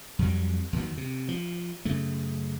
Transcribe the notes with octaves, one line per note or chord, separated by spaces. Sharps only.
F2 F#3 G3
D#2 D#3 F#3
C3
F3
F#2 C#3 A3